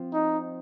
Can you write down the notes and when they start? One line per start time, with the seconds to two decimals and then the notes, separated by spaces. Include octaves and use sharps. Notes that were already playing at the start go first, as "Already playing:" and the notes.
Already playing: F3 C4 F4
0.13 D#4